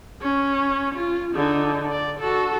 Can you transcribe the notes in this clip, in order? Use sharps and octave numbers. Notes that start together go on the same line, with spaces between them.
C#4
F4
D3 D#4
D5
F#4 A4